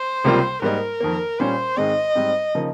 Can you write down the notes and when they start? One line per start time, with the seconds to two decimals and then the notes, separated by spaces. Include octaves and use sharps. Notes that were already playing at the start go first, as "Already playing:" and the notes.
Already playing: C5
0.24 C#2 C3 G3 A#3 F4
0.62 G#2 G3 A#3 D#4 A#4
1.00 F2 D#3 A#3
1.39 A#2 G3 C#4 C5
1.76 G#2 D#3 G#3 C4 D#5
2.15 G#2 G3 C4
2.55 C#3 F3 A#3 D#4